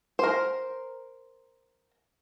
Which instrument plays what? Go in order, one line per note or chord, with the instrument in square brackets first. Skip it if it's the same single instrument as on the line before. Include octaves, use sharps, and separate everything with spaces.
[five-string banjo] A#4 C5